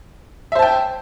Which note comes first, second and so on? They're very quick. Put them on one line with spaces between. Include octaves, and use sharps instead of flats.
E5 C5 A5 G5